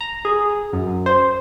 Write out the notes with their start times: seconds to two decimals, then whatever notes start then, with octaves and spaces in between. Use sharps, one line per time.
0.01 A#5
0.25 G#4
0.73 F#2
1.06 C5